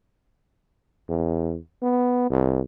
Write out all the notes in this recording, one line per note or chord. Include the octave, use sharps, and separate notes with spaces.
E2
B3
C2